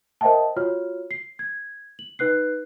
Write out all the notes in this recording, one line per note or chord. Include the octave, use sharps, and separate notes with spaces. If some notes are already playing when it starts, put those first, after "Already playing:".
A#4 C5 D#5 E5 G5 A5
F4 F#4 C#5 F6
C7
G#6
F#7
D#4 B4 F#6 C7